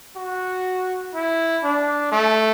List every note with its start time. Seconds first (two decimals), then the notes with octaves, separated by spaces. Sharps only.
0.17 F#4
1.14 E4
1.64 D4
2.12 A3